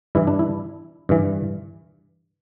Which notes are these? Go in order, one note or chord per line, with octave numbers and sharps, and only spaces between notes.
G2 E3 E4
D4
E4
G2 E3